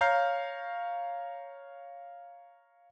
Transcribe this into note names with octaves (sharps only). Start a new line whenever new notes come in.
C#5 F5 A#5 F6 G6 C7